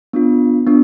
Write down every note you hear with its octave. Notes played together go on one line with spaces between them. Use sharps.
B3 D4 F4
B3 D4 F4